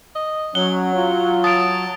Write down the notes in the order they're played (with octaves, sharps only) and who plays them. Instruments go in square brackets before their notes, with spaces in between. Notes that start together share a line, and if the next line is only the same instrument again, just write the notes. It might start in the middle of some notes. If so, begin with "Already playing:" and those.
[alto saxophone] D#5
[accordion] F#3 [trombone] C#4 [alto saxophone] F#5 [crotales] G7
[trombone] F4
[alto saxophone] A5 [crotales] D#6 D7